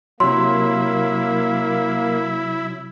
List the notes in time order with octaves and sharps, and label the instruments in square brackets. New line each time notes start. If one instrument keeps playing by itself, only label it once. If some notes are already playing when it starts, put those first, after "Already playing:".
[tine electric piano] C3 F#3 [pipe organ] A#3 [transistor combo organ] E4 [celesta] C6